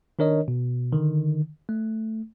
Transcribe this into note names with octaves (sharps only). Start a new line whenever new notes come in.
D#3 D4 A#4 C#5 D#5
B2
D3 D#3
A3